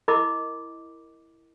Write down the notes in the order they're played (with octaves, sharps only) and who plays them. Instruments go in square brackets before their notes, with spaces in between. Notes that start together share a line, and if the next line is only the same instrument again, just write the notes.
[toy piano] E4 A#4 D#5 B5 D6